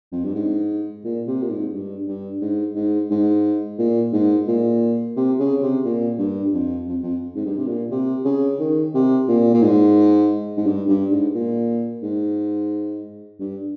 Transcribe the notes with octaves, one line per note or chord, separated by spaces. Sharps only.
F2
G2
G#2
A#2
C3
A#2
G#2
G2
G2
G#2
G#2
G#2
A#2
G#2
A#2
C3
C#3
C3
A#2
G2
F2
F2
F2
G#2
G2
C3
A#2
C3
C#3
D#3
C3
A#2
A#2
G#2
G#2
G2
G2
G#2
A#2
G#2
G2